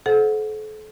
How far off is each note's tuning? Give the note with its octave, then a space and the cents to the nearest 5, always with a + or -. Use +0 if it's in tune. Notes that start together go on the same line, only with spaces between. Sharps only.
A4 -40 C5 +0 F#5 -25